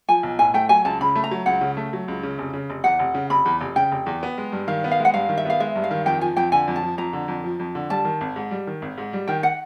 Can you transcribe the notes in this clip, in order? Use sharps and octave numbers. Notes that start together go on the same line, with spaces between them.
F3 G#5
B1
A2 G#5
A3 G5
F#3 G#5
C#2 A5
C#3 B5
A3
A#5
F#3
C#2 F#5
C#3
A3
F#3
C#2
C#3
F1
C#3
F1
E2 F#5
F1
C#3
F1 B5
E2
F1
C#3 G5
F1
E2
B3
G#3
G2
D#3 F5
B3
F5
G#3
F#5
G2 F5
D#3
E5
B3 F5
G#3 E5
G2
F5
D#3
F2 G5
F3 G#5
F2 G5
D3 G#5
F2
A5
F3
F2 A#5
D3
F2
F3
F2
D3
G3 A5
D#3
G#1
G#2
G3
D#3
G#1
G#2
G3
D#3 G5
F#5